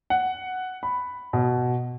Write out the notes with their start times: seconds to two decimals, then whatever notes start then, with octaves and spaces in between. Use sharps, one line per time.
0.10 F#5
0.83 B5
1.33 B2